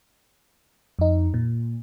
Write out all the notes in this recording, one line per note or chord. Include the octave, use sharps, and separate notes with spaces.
F2 D#4
A#2